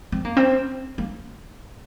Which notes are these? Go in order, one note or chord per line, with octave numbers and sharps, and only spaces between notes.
C4
A#3
C4
A#3